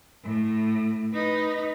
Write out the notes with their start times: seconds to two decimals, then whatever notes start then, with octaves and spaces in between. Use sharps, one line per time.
0.23 A2
1.13 D#4 B4